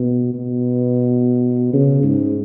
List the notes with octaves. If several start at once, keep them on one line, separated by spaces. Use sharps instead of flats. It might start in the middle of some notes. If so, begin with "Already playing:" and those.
Already playing: B2
B2
C#3
G#2